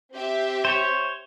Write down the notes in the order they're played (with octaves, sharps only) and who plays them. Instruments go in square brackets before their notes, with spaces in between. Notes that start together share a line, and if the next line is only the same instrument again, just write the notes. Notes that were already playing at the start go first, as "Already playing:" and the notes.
[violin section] C4 G4 E5
[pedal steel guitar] C5 C#5